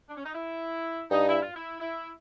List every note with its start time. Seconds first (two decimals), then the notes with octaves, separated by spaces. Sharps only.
0.08 D4
0.17 C#4
0.25 D#4
0.34 E4
1.11 G2 D#4
1.28 E4
1.41 F4
1.55 E4
1.80 E4